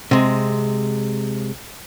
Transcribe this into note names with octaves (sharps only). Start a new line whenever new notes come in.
C3 G#3